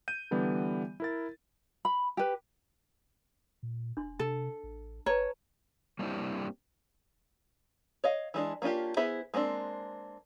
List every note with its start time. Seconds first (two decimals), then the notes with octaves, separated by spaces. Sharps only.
0.08 G6 D#7
0.31 D3 E3 G3 B3 D5
1.00 E4 A#4 A6
1.85 B5
2.17 G4 B4
3.63 A#2
3.97 E1 D4 C6
4.19 C3 A4
4.63 A1
5.06 G1 B4 C#5 A5 A#5
5.99 G3 A#3 C4 D4 E4 G4
8.04 C#5 D#5 F5
8.34 E3 G#3 D4
8.62 A#3 C#4 D4 F4 G4
8.97 B3 E4 G#4 C5 E5
9.34 G#3 A#3 C4 D4